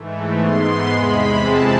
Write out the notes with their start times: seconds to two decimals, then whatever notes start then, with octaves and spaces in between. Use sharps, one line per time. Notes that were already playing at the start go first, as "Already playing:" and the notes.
Already playing: G#2 E3 A3
0.40 G#2 G#3 B3 C6
0.90 E2 C3 G#3 B5
1.39 F2 C3 E3 G#3 C4 A5